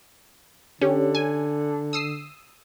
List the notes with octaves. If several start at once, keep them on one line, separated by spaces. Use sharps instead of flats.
D3 C#4 G4
G#5
D#6 E6 C7